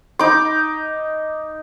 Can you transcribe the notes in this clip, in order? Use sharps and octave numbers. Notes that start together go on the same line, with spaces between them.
D#4 D6